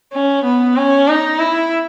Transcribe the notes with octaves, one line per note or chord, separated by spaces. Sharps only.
C#4
B3
C#4
D#4
E4